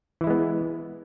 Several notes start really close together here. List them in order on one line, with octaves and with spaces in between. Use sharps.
E3 E4 G#3 B3